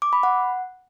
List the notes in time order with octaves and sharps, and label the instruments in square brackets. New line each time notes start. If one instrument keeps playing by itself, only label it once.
[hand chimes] D6
B5
F#5